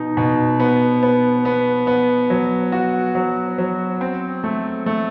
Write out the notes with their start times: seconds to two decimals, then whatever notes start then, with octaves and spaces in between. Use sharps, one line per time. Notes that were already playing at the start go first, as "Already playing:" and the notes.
Already playing: B2 D#4
0.17 B2
0.60 B3
1.03 B3
1.45 B3
1.87 B3
2.30 F#3
2.72 F#4
3.15 F#3
3.58 F#3
4.01 C4
4.44 A3
4.86 A3